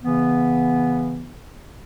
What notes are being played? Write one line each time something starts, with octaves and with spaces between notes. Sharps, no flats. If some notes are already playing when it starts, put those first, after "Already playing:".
C#3 E3 B3